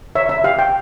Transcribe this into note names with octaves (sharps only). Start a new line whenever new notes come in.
C#5 E5
E5
G4 F5
G5